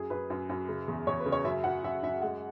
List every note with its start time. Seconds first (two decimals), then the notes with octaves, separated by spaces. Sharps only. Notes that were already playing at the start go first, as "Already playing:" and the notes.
Already playing: F#2 G#4
0.10 F#2 B4
0.30 F#2
0.50 F#2
0.69 C#3
0.88 E2
1.07 E2 C#5
1.20 B4
1.26 C#3
1.32 C#5
1.45 F#2 E5
1.64 F#2 F#5
1.84 F#2 E5
2.03 F#2 E5
2.22 G#3 F#5